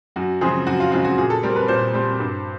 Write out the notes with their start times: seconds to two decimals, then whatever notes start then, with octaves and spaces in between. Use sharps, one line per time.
0.16 F#2 F#4
0.41 C#3 F3 G#3 C4 G#4
0.66 F#2 F#4
0.80 F4
0.92 C#3 F3 G#3 C4 F4
1.04 F#4
1.18 A#2 G#4
1.30 A4
1.43 G3 C4 A#4
1.56 B4
1.68 A#2 C5
1.94 G3 C4
2.20 G2